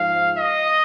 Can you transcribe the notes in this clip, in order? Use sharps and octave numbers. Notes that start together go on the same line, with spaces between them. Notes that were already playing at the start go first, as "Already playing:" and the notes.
Already playing: G#2 F3 F5
D#5